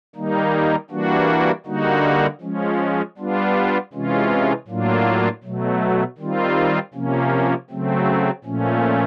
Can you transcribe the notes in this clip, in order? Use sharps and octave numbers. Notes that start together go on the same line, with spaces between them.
D#3 G3 A#3 D#4
E3 G3 A#3 D4 F#4
D3 G3 A#3 D#4 F#4
F3 G#3 C#4
G3 B3 D4 F4
C3 E3 G#3 C#4 F4
A2 F#3 A#3 D4 F4
B2 F#3 A3
D#3 G3 C4 F4
C3 F3 A#3 C#4
C#3 F#3 A3 C4
A#2 F3 A3 C#4